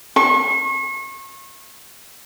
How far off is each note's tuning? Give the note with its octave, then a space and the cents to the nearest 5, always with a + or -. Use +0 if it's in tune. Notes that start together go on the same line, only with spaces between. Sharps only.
C#6 -35